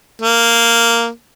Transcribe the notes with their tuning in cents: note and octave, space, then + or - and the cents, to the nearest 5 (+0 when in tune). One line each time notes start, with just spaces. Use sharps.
A#3 -5